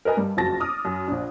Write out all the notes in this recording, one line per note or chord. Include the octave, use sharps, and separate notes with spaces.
A#4 B4 D#5 G#5
G2 G3
F#1 F2 F#4 A5 A6 A#6
D6 D#6 F6
F#2
A#1 D4